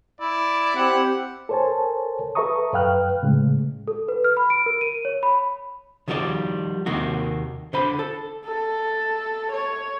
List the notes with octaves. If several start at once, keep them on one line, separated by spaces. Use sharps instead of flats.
E4 D5
C4 G4 F#5
A4 A#4 C5 C#5 G#5 A5
A4 B4 E5 A#5 C#6 D#6
F#2 B4 F5 G5 F6 F#6
A2 C#3 G#3
A4
B4
F6
B5
D7
A#4
D#7
C#5
B5
D#3 F3 G3 F#4 G#4 D5
D#2 C3 D#3 A#3 F#4
D3 C5 B5
A4
A4
C#5